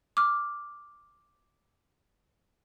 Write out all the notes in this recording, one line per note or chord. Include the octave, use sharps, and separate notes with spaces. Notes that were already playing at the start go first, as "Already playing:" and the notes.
D6 F6